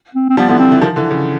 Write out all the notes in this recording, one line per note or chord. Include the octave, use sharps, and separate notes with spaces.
C4
C4
F3 G3 B3
D3 E3 B3
C4
D3 E3
D#3 F3
D3 E3
C#3